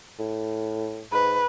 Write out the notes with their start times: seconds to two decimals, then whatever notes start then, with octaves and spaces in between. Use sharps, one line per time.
0.19 A2
1.12 G#2 B4